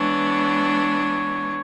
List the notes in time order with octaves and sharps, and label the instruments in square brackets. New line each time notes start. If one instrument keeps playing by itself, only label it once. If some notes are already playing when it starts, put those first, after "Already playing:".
Already playing: [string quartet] E3 G#3 B3 D4 [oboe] C#5